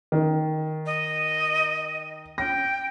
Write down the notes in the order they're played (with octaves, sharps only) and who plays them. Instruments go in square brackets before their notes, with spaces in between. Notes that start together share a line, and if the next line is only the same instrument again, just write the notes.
[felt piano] D#3
[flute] D#5
[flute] G5 [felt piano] A#6